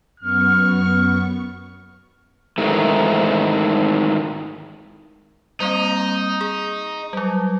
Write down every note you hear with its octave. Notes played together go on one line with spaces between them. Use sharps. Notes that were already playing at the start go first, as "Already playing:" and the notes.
F#2 B3 C#6 F6
G#2 D#3 E3 A3
G3 A#3 C4 D#4
G#4
F#3 G3